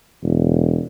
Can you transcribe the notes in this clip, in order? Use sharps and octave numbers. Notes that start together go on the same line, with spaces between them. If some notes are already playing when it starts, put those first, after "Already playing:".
E1